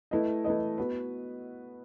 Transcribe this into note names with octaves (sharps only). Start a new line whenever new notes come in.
A3 E4 B4 D#5
A3 E4 B4 D#5
B3 F#4 B4